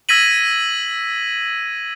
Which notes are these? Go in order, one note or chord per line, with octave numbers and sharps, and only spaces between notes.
E6 G#6 A#6 B6 D#7 F#7